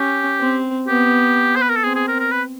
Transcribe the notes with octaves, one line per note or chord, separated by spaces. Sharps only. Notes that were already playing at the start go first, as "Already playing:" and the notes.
Already playing: C#4 G4
C4
B3 G4
C5
B4
A#4
A4
C4 G#4
G#4
A#4
A#4
B4